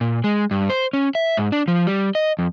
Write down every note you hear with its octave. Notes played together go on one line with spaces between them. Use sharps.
A#2
G#3
G2
C5
C#4
E5
G#2
D4
F3
G3
D#5
F2